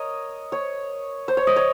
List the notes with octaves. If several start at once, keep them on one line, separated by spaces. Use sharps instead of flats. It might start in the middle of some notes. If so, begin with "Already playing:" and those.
Already playing: A#4 C#5 D#5
C#5
C5
C#5
D#5
C#5